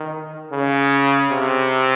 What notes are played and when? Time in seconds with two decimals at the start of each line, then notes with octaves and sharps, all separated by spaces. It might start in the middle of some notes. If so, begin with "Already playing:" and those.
Already playing: D#3
0.52 C#3
1.30 C3